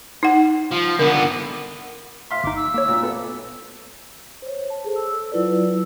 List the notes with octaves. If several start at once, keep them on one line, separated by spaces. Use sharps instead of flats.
D#4 F#5
F3
D3 B3 A#4
E5 F5 C6 B6
G1 D#4 D6
E6
A#3 C#5
A#2
B3 A4 E6
C5 C#5
A5
G#4 A4 C5
E6
F#3 E4 F4 B4 D5 E6